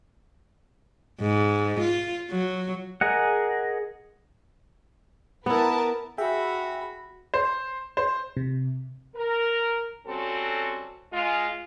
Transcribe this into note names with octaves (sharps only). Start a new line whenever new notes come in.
G#2
F4
F#3
G#4 A#4 D#5 F#5
B3 E4 A#4 B4 A5
F#4 G#4 E5 G5 B5
C5
C5
C3
A#4
G3 C4 C#4 F#4 A4
G#3 F4